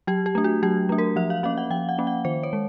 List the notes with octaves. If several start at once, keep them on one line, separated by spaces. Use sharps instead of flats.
F#3 G4
G4
A3 D4
F#4
F#3 G4
A3 D4
A#4
F3 E5
F5
A#3 C#4 F5
F#5
F3 G5
F#5
A#3 C#4
F#5
D#3 C5
C#5
G#3